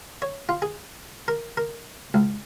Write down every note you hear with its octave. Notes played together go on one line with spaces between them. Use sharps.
C#5
F4
G#4
A#4
A#4
C#2